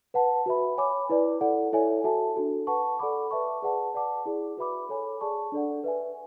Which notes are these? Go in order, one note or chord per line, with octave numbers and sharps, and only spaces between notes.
B4 F#5 A5
F#4 B4 E5 B5
C#5 G#5 B5 D6
E4 B4 D5
E4 A4 D5 F#5
E4 A4 C#5 E5 G#5
F#4 A4 E5 A5
D4 F#4 A4
B4 F#5 A5 C#6
A4 D5 F#5 B5 D6
B4 E5 A5 C#6
G#4 B4 D5 F#5 A5
B4 D5 F#5 A5 D6
E4 G#4 D5
F#4 B4 E5 B5 D6
A4 C#5 G#5 B5
G#4 D5 A5 C#6
D4 A4 D5 F#5
B4 E5 G#5